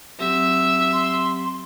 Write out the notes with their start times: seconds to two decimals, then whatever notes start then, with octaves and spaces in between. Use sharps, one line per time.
0.20 F#3 C4 G4 E5
0.93 C6